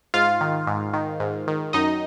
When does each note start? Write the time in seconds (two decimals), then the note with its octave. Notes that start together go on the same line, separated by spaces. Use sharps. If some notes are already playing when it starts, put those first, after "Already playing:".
0.14 G#2 F4 F5
0.41 D#3
0.67 G#2
0.93 D#3
1.20 G#2
1.48 D#3
1.73 F#2 D#4 D#5